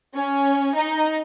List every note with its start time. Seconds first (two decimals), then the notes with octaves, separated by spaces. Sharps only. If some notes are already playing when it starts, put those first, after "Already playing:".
0.14 C#4
0.75 D#4